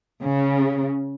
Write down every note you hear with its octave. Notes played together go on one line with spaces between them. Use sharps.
C#3